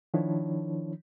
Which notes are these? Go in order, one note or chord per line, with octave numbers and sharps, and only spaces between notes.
D#3 F3 D4 E4 C#5